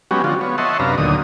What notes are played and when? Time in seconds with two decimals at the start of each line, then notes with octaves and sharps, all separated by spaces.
0.11 F#3 G#3 B3 C#4 F#4 G4
0.24 D3 F3 F4 F#4
0.41 B3 C#5
0.58 C#5 D#5 E5 F#5 A5 C6
0.80 F#2 C3 D4 B4 F5 A#5
0.98 D2 A#2 D3 D#3 F#3 D#6